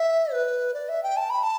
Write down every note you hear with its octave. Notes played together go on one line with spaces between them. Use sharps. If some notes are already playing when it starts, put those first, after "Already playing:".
Already playing: E5
B4
D5
E5
G5
A5
B5
A5